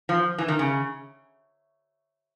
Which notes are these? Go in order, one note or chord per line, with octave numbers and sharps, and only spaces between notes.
F3
E3
D#3
C#3